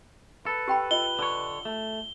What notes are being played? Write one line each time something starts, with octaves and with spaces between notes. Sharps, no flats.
A4 B4
G4 G5 B5
F4 D#5 G7
D3 C#5
A3